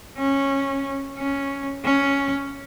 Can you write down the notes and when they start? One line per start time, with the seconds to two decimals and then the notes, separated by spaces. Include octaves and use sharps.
0.18 C#4
1.18 C#4
1.84 C#4